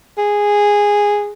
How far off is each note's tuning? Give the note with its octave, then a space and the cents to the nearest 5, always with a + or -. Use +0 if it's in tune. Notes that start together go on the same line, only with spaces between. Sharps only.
G#4 -10